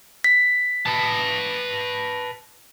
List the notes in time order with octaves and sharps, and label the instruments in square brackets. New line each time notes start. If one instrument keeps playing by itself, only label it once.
[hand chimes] B6
[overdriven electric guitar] B4 A5